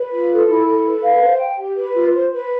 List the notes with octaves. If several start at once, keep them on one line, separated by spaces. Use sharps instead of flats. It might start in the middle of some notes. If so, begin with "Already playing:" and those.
Already playing: B4
F4
A4
E4
A4
B4
F5
C5
G5
G4
B4
F4
C5
B4